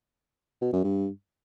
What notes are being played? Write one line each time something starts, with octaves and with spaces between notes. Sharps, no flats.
B2
F#2
G2